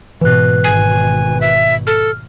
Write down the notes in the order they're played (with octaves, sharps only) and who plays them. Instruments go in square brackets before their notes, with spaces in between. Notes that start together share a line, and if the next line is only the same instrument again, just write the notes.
[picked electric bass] G#2 E3 [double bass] B2 [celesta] B4 F#6
[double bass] G#1 B2 [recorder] G#5
[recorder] E5
[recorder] A4 [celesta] F6